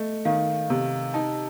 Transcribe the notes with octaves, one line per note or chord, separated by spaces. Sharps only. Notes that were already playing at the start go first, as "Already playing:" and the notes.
Already playing: A3 D#5
D#3 F5
C3
D#4 A5